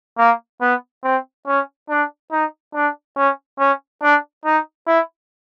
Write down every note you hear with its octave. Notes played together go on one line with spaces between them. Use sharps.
A#3
B3
C4
C#4
D4
D#4
D4
C#4
C#4
D4
D#4
E4